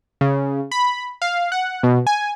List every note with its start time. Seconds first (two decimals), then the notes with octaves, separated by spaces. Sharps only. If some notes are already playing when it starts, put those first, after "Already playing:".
0.21 C#3
0.72 B5
1.22 F5
1.52 F#5
1.83 B2
2.07 G#5